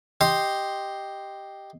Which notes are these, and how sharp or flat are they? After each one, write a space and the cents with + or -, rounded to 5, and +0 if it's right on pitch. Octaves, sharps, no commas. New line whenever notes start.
G4 +0 D#5 +0 C6 +0